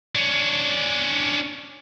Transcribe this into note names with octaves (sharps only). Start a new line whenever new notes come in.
C#4 D4